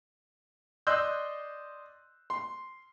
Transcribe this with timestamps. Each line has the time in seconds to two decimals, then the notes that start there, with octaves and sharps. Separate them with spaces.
0.87 D5 D#5 C6 E6 F#6 G6
2.30 C6